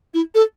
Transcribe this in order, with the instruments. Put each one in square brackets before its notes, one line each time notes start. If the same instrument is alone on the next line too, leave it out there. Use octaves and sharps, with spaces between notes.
[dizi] E4
A4